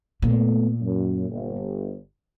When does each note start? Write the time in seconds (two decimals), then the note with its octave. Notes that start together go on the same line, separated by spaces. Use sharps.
0.22 A#2 A3 B3
0.81 F#2
1.29 G1